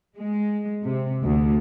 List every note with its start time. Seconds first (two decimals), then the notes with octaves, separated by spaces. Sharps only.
0.17 G#3
0.85 C3
1.23 D2